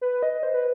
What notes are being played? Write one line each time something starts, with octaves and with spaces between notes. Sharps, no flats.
B4
D#5
C5
B4